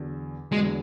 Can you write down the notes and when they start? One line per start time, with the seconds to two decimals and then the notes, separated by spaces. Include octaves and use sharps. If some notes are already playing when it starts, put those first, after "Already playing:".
Already playing: E2 D3 F#3
0.52 E2 D3 F#3 G#3